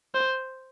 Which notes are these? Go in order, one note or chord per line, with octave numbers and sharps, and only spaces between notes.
C5